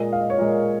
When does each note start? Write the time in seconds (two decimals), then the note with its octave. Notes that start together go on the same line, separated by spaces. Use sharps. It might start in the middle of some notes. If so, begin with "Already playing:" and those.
Already playing: A#2 G#3 D#5
0.13 F5
0.21 D#5
0.30 C#5
0.38 A#2 G#3 A#4